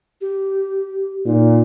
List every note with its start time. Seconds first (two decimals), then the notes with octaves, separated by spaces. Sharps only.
0.21 G4
1.26 A#2 D#4